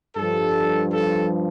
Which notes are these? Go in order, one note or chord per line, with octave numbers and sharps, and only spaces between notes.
G2 F3 A4
A4